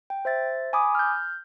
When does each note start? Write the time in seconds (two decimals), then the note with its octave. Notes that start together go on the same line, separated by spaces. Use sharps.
0.10 G5
0.25 C5 E5 A6
0.73 G#5 B5 D6 D#6
0.95 F6 G6